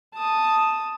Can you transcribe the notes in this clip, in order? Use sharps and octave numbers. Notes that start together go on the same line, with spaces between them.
A5 D#6